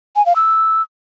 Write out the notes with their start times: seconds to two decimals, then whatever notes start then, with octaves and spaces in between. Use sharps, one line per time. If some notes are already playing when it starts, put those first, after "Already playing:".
0.16 G#5
0.26 F5
0.36 E6